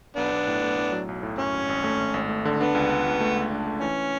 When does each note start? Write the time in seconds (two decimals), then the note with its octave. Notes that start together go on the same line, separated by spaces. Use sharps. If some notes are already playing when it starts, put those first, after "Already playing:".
0.16 B1 B3 D4
0.31 B1
0.47 A2
0.63 A2
0.77 A2
0.92 F#3
1.09 B1
1.23 A2
1.38 F#2 C#4
1.54 G#1
1.69 G#1
1.84 A3
2.00 G#1
2.14 G#1
2.29 A3
2.45 D3
2.60 B3 D4
2.75 C#2
2.90 D4
3.06 C#2
3.21 A3
3.36 C#2
3.51 D4
3.67 A3
3.81 E3 C#4